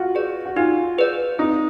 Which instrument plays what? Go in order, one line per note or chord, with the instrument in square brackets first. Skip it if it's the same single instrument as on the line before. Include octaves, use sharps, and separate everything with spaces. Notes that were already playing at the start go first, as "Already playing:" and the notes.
Already playing: [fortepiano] F4 F#4
[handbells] G#4 B4 D5
[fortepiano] F#4
[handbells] D#4 [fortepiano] F4
[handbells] G#4 B4 D5
[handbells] C4 [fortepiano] D#4